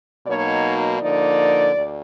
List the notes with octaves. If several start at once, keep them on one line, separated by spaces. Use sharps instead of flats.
B2 F#3 A#3 D#4 C#5
D3 F3 A#3 D#4 D5
D2